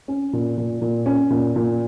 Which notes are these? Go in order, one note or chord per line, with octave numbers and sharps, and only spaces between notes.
C#4
A#2
A#2
A#2
C#4
A#2
A#2